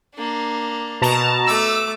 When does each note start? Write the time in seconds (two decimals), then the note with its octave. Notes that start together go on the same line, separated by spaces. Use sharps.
0.14 A#3 D4
1.02 B2 A5 A#5
1.47 A3 D6 E6